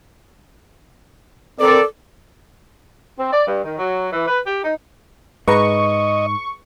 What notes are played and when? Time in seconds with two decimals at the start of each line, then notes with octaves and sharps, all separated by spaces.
1.60 C4 A4 A#4 D5
3.18 C4
3.33 D5
3.47 G2
3.64 D#3
3.78 F#3
4.13 E3
4.28 B4
4.46 G4
4.64 D#4
5.48 G#2 G#4 B4 D#5 A#5 C#6